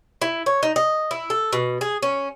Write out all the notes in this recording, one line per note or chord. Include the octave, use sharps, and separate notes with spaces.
E4
C#5
D#4
D#5
E4
A4
B2
G#4
C#4